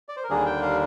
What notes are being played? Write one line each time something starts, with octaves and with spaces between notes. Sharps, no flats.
D5
C5
A#4
D#2 D3 G3 A#3 D4 G#4
G5
F5